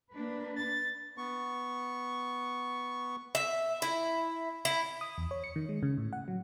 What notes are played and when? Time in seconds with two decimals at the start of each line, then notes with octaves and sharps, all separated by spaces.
0.12 A#3 D4 B4
0.56 A6
1.18 B3 C#6
3.35 E5
3.82 E4
4.65 E4
5.01 D#6
5.18 E2
5.31 C#5
5.44 C#7
5.56 D#3
5.69 G#3
5.83 C#3
5.98 A2
6.13 F#5
6.28 F#3